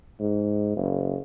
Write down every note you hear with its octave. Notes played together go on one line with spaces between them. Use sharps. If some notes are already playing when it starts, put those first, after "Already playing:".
G#2
F#1